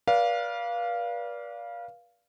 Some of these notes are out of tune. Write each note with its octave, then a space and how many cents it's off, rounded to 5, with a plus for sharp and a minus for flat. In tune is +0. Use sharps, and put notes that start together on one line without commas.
B4 -40 D5 -20 F5 +0